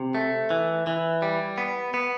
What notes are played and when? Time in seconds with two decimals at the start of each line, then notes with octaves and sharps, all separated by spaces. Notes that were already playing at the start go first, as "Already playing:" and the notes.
Already playing: C3
0.15 A3
0.50 E3
0.87 E3
1.22 G3
1.58 B3
1.94 B3